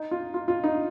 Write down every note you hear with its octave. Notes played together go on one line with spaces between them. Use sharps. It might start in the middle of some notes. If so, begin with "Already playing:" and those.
Already playing: D#4
F4
F4
F4
D#4